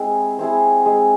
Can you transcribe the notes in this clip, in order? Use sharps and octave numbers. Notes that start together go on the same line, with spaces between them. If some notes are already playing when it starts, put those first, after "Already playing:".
Already playing: G#3 C4 E4 G#4
C4 E4 G#4
G#3